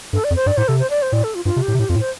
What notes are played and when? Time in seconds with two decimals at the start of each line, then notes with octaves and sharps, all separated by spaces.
0.13 G2 A4
0.24 D5
0.31 F2
0.36 C5
0.46 G2 D5
0.57 A2 C5
0.68 C3 A4
0.79 C5
0.90 D5
1.02 C5
1.12 A2 D5
1.24 A4
1.35 F4
1.45 G2 F4
1.56 C3
1.62 G4
1.68 A2
1.74 C3
1.79 A2 G4
1.89 F2 F4
1.96 A2
2.00 C5